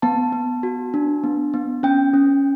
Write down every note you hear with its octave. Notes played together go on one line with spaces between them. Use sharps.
B3 A5
B3
F#4
D4
B3
B3
C#4 G5
C#4